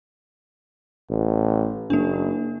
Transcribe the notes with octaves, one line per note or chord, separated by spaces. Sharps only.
A1
F#1 A#3 D4